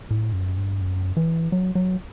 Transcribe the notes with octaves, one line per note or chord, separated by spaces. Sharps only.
A2
F#2
G2
F#2
E3
F#3
F#3